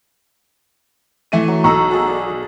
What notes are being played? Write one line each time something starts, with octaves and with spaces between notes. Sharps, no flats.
E3 A3 D#7
F#3
B1 F#3 D#4 A4 A#5 C#6 E6
F#4 G#4 A5
D5